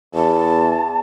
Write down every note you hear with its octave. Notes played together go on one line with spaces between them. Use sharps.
E2 A5